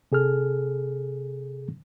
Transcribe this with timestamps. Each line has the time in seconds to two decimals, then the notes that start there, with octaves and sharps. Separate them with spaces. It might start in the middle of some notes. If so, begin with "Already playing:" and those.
0.12 C3 G#4 A4 F6